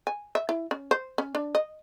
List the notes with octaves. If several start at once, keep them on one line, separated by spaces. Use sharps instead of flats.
G#5
E5
E4
C#4
C5
C#4
D4
D#5